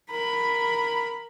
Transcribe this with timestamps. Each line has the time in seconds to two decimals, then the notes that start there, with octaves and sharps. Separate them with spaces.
0.10 A#4 B5